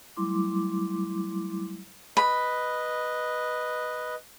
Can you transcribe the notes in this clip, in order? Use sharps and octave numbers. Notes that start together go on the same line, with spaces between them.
F#3 G3 A3 E4 C6 D6
B4 D#5 B5